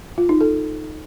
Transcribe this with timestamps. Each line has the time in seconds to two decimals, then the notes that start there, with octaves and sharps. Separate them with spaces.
0.18 F4
0.29 D#4
0.41 A4